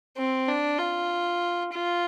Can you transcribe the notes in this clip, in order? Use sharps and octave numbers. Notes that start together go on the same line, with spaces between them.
C4
D4
F4
F4